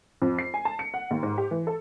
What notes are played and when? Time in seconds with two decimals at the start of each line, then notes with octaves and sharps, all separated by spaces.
0.22 F2
0.39 C7
0.54 G#5
0.65 A5
0.79 C#7
0.94 F#5
1.11 D#2
1.23 G#2
1.38 G4
1.51 E3
1.67 A4